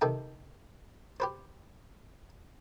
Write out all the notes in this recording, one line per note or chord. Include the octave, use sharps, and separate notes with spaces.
C3 D#3 A4 G5
G4 B4 C5